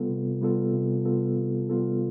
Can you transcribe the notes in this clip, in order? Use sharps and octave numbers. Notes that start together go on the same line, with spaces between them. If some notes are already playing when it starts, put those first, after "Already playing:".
Already playing: C3 G3 B3 F4 A4
C3
G3 B3 F4 A4
C3
G3 B3 F4 A4
C3
G3 B3 F4 A4